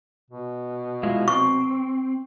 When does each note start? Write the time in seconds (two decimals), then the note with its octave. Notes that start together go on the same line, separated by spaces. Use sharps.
0.31 B2
1.03 G#3 E4 F4
1.28 C4 C#6